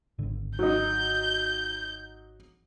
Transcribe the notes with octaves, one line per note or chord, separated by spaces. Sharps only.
G#1 D3
F#3 D#4 G6